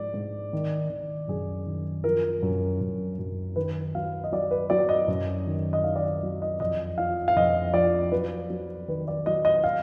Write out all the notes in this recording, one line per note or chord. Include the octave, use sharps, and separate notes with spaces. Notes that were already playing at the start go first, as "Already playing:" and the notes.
Already playing: G#2 F3 D5
G#2
D#3
D#3
F#2 G#4
D#3
F3 A#4
F#2
F#2
F#2
D#3 B4
F#3 F5
D#5
F#3 D5
B4
F#3 D5
D#5
F#2
D#3
D#5
D#3 F5
D5
D#5
F#3
D#5
F2 D#5
F3 F5
F5
F2 D#5
F3 D5
F#3 B4
F#3
D#3 B4
D5
F#3 D#5
D#5
F5